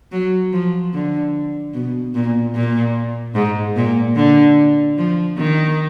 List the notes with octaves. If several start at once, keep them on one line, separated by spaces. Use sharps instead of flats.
F#3
F3
D3
B2
A#2
A#2
G#2
A#2
D3
F3
D#3